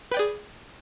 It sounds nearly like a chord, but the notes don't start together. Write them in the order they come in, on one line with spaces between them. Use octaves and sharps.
B4 G5 D5 G#4